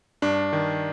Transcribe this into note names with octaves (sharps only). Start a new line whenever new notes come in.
G2 D4
D#3